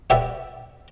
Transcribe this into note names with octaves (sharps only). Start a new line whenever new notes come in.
F#4 G4 B4 D5 E5 F#5